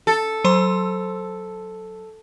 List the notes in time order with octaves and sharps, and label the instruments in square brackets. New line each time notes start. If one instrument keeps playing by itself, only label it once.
[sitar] A4
[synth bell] F#3 C5 C6